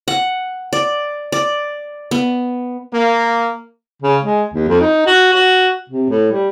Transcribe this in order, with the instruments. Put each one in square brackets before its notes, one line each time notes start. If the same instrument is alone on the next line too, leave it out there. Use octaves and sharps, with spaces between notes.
[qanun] F#5
D5
D5
B3
[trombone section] A#3
[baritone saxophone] C#3
G#3
D#2
F2
D#4
F#4
F#4
C3
A2
G3